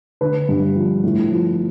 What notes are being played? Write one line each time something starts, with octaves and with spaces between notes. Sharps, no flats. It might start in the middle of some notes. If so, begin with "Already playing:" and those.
D3 B4
G2
F3
A2
F3